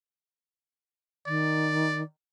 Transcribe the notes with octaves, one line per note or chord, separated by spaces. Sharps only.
D#3 D5